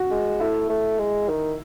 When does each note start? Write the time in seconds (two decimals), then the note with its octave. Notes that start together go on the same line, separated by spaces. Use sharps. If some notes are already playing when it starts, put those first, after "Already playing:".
Already playing: F#4
0.11 G#3
0.40 A3 E4
0.69 A3
0.99 G#3
1.28 D#3